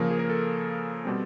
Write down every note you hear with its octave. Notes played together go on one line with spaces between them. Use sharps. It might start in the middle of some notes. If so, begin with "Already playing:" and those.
Already playing: C#3 F3 A#3 A#4
G#4
A#4
A4
B2 G3 C4